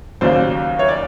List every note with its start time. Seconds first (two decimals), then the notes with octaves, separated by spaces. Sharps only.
0.21 D#2 C#3 F#3 C5 D5
0.79 C#5
0.89 D5